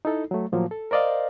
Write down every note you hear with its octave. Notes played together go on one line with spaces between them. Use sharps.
D#4 E4 A4
F#3 A3
A2 F3 F#3 A#3
A4
A#4 C5 D5 D#5 F5